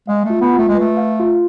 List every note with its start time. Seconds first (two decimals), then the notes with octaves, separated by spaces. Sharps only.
0.07 G#3 F5
0.25 A3
0.30 F4
0.41 B3
0.53 F4
0.58 A3
0.69 G#3
0.75 A3 B4
0.97 F5
1.19 F4